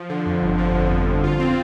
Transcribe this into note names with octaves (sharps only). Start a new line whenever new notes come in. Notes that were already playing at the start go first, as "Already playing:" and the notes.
Already playing: F3
D3
F2
G1
F3
D3
F2
G1
F4
C4